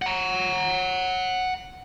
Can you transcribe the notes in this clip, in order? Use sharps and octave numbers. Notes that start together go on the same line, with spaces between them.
F#5 A#5